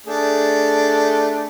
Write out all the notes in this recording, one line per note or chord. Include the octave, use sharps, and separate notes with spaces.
A3 D4 G#4